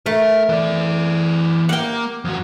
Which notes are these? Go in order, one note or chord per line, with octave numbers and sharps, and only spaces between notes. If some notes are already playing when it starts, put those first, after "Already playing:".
A3 A#4
E3 D5
A#3 F#5 G5
F2 F#4